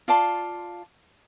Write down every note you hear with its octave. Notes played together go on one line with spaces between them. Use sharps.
F4 D5 A5 C6